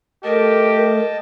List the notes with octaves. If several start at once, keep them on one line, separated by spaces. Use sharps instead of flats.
A3 G4 A#4 D#5 G5 A5